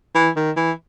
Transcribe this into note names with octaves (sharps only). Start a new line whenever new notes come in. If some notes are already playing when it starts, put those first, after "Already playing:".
E3
D#3
E3